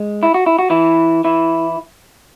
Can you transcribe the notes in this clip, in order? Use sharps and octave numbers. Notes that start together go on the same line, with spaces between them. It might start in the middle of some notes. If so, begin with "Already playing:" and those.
Already playing: G#3
E4
F#4
E4
F#4
E3 E4
E3 E4